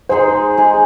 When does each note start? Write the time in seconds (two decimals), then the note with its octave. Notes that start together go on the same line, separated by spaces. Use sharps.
0.09 G#3 D#4 G#4 C5
0.57 G#3 D#4 G#4